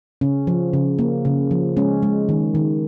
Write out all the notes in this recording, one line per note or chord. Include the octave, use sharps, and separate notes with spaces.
C#3 C#4
F3
C#3
A#3
C#3
F3
G#3 C#4
G#3
D#3
D#3